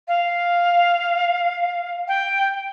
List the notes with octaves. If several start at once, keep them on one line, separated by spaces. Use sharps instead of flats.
F5
G5